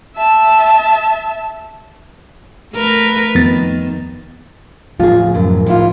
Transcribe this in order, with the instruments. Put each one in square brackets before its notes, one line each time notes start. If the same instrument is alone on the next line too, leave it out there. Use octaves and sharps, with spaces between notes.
[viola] E5 A5
[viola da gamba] A3 A#4 B4
[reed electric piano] F2 B3 A6 [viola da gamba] D#3
[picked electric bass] A2 F3 G#3 [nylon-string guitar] F4 G#4
[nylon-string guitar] F#2
G#2 E4 F4